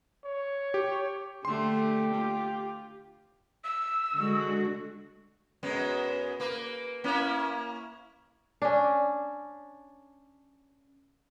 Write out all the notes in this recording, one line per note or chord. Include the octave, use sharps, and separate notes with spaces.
C#5
G4
D3 A3 G4 C6
F4
E6
D3 G#3 F#4
F#2 G#3 B3
A#3 B4
A#3 C#4 E4
C#4 D4